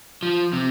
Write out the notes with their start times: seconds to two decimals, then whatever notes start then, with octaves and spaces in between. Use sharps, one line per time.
0.23 F3
0.53 C3